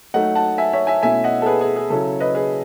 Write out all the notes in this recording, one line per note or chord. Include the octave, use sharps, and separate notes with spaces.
F#3 A3 D#4 D#5 F#5
F#5 A5
E5 G#5
C#5 E5
E5 G#5
B2 A3 C#4 E4 E5 G#5
D#5 F#5
A4
G#4 B4
G#4
G#4
C#3 F#3 C#4 E4 A4
B4 D#5
G#4 B4